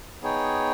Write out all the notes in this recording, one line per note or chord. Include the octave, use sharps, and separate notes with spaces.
B3 D#4 G#4 C#5 G5